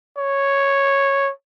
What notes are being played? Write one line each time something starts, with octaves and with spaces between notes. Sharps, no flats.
C#5